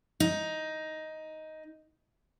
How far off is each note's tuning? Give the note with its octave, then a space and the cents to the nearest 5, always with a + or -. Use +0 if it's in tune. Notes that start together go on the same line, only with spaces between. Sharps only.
D#4 +10